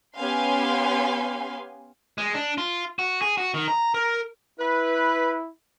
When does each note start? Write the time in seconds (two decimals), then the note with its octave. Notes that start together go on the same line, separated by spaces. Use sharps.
0.16 B3 C#4 G4 F5 G#5 C6
2.18 G#3
2.34 D4
2.58 F4
2.99 F#4
3.22 G#4
3.38 F#4
3.54 D#3
3.68 A#5
3.94 A#4
4.60 E4 B4